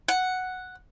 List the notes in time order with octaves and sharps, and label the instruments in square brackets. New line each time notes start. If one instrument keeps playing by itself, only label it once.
[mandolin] F#5